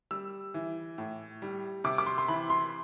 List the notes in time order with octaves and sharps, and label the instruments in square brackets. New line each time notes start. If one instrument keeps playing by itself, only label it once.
[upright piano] G3 E6
E3
A2
G3
C3 D6
D6
C6
C6
E3 B5
C6